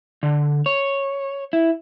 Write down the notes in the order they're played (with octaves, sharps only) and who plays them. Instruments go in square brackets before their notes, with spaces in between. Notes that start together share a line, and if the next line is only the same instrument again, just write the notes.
[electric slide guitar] D3
C#5
E4